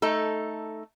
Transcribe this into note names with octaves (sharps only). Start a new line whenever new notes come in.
A3 D#4 A4